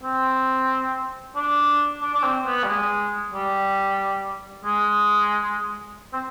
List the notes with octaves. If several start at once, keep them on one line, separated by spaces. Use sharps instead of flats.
C4
D4
D4
D4
C4
B3
G3
G#3
G3
G#3
C4